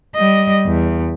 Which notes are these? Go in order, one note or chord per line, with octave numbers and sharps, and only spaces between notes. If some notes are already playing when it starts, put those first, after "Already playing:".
G3 D#5
E2